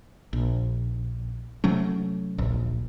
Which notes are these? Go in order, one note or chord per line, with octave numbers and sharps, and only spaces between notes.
A#1
C3 F#3 A3 C#4
D1 A#1